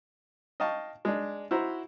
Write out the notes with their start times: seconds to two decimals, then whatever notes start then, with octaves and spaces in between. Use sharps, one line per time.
0.60 D#5 F5 G5 A5 C#6
1.05 G#3 D4
1.51 E4 F#4 C5 A#5